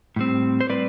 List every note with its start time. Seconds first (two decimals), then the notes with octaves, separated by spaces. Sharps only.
0.16 A2 G3 C4
0.61 C5
0.69 A2 G3 C4 B4 D5